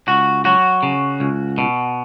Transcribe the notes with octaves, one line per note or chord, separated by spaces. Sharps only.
C#2 F#4
F#3 F#4
C#3
C#2
B2